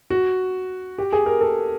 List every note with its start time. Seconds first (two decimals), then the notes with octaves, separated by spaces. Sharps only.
0.10 F#4
0.98 G4
1.13 G#4
1.26 A#4
1.41 A4